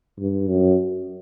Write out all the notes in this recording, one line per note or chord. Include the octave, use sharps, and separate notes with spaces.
G2
F#2